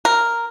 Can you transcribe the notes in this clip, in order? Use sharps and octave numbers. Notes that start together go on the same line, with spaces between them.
A#4